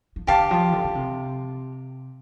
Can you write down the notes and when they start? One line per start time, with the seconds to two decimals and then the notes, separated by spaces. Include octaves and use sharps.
0.16 F3
0.27 D3 G4 F5 A5 D6
0.51 F3
0.72 D3
0.84 D3
0.95 C3